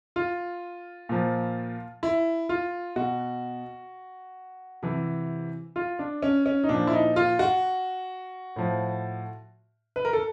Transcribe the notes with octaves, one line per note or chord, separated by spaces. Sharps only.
F4
A#2 F3
E4
F4
B2 F#4
C3 E3
F4
D4
C#4
C#4
D#4
A#2 F3 D4
E4
D#4
F4
F#4
A2 F3
B4
A#4
A4